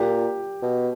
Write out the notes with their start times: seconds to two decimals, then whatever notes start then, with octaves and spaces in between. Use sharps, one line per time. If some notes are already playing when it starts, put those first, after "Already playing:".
Already playing: A#2 G4
0.63 B2